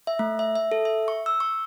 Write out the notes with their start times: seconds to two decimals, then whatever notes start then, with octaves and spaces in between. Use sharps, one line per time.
0.07 E5
0.19 A3
0.39 E5
0.56 E5
0.72 A4
0.85 E5
1.08 C#6
1.26 E6
1.40 C#6